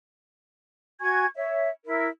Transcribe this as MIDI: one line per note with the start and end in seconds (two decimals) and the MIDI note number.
1.01 1.26 66
1.01 1.26 80
1.01 1.26 85
1.01 1.26 92
1.35 1.68 73
1.35 1.68 76
1.84 2.07 64
1.84 2.07 70